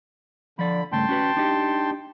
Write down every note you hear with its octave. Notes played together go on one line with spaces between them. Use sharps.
D3 F3 D5 B5
G2 C#3 A3 G5 A5 C6
C#4 F#4 B4
D4 D#4 G4